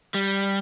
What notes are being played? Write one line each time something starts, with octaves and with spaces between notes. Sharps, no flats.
G3